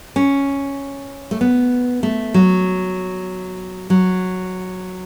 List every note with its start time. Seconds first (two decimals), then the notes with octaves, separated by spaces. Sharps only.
0.16 C#4
1.31 A3
1.41 B3
2.03 A3
2.34 F#3
3.90 F#3